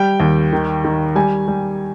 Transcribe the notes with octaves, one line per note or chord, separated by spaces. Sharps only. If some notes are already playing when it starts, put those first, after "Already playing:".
Already playing: G3 G5
D#2
D#3
D#3
G3 G#5
G3